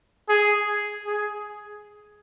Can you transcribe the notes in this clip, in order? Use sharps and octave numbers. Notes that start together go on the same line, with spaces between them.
G#4
G#4